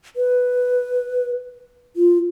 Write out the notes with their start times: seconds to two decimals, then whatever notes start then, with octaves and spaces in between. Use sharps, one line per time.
0.16 B4
1.96 F4